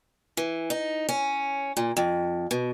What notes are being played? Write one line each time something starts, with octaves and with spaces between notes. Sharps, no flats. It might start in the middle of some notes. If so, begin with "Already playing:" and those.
E3
D#4
C#4
A#2
F2
B2